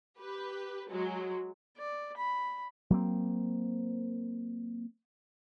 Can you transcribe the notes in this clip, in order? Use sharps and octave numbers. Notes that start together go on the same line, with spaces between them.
G4 B4
F#3 G#3
D5
B5
F#3 A#3 C4